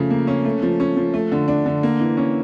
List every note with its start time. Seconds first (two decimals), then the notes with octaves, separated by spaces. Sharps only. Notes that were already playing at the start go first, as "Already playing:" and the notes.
Already playing: C#3 F3 A3
0.10 A#3
0.27 C#4
0.45 A3
0.62 F3
0.80 C#4
0.97 F3
1.14 A3
1.32 D3
1.48 D4
1.66 D3
1.83 A#3
2.00 E3
2.17 C#4